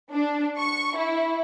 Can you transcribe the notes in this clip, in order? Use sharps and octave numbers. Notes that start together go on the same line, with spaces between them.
D4
C#6
E4